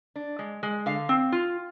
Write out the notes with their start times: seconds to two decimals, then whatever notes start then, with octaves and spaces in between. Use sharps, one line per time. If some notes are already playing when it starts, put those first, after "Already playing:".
0.16 D4
0.39 G#3
0.63 G#3
0.86 D3 F5
1.09 C4
1.32 F4